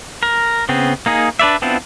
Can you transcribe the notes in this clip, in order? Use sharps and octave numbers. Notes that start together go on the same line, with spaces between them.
A#4
C#3 B3 C4
A#3 D#4 G#4
D4 B4 D5 E5
B3 C4 D4 E4 F4